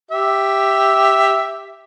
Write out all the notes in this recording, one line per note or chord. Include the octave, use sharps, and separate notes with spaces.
G4 E5